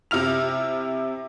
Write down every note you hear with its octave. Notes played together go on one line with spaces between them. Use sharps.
C3 E4 F6 F7